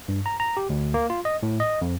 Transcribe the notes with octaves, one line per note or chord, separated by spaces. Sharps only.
G2
A#5
A#5
G4
D2
A#3
F4
D#5
A2
D#5
F2